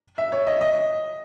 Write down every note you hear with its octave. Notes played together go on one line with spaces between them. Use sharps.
E5
C#5
D#5
D#5